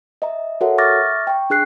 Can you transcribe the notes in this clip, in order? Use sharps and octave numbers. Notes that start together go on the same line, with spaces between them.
D#5 E5 A#5
F#4 A4 A#4 C#5 E5 F#5
E5 C#6 D6 F6 A6 A#6
G5 C#6
D4 G#4 F#6 C7